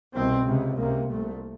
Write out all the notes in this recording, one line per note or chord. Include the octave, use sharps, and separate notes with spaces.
C2 B2 C4
C#2 C3
C#2 C3 A#3
C2 A#2 A3